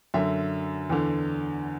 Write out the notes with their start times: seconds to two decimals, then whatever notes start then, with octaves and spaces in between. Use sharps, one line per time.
0.14 F#2 D3 E5
0.90 E2 D3